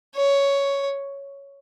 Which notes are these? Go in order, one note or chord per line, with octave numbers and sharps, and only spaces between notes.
C#5